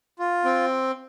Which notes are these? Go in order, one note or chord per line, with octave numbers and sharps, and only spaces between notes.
F4
C4